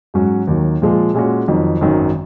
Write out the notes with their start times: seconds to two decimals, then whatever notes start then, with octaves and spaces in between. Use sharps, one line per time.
0.14 G#2 F#3 C#4 F#4
0.47 D#2 D#3 F#3
0.82 A#2 F3 G#3
1.14 A#2 G#3 C#4 F#4
1.48 F2 D#3 F#3
1.81 G#1 F#2 D#3 F#3